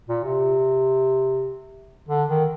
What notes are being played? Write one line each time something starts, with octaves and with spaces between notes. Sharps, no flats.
A#2
C3
D3
D#3